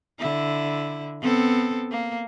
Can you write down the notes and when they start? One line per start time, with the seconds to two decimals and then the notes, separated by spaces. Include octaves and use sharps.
0.19 D3 E4
1.21 B3 C4 A4
1.91 A#3